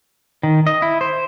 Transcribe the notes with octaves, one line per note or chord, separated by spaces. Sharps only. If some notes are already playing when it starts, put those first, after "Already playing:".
D#3
D#5
E4
C5